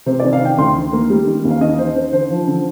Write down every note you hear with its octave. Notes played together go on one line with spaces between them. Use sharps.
C3 C5
D5
D#3
F5
D#3 G5
D2 C6
D#3
A#3
G3
D#3
D#2
F5
D#3 D#5
D#3 C5
D#3 C5
D3 C5
F3
D3